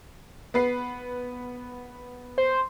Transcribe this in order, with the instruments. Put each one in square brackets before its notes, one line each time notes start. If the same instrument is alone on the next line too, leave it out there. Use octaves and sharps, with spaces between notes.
[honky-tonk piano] B3 B4 C7
[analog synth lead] C5